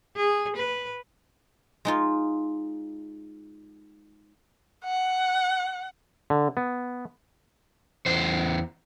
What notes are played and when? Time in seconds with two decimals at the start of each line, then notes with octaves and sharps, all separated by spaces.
0.17 G#4
0.56 B4
1.85 G#3 D#4 F4
4.84 F#5
6.30 D3
6.57 B3
8.06 E2 C5